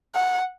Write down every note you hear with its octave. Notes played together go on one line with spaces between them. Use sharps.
F#5